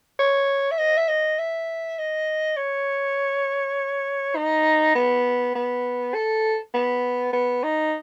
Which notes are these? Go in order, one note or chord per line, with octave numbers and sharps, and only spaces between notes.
C#5
E5
D#5
E5
D#5
E5
D#5
C#5
D#4
B3
B3
A4
B3
B3
D#4